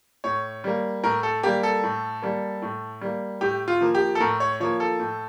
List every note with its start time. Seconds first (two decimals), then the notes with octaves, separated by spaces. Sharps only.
0.24 A2 C#5
0.64 G3 A#3
1.03 A2 A#4
1.23 A4
1.43 G3 A#3 G4
1.63 A4
1.83 A2
2.22 G3 A#3
2.62 A2
3.02 G3 A#3
3.41 A2 G4
3.68 F4
3.81 F3 A#3
3.95 G4
4.15 A4
4.20 A2 A#4
4.40 C#5
4.60 F3 A#3 C#5
4.80 A4
5.00 A2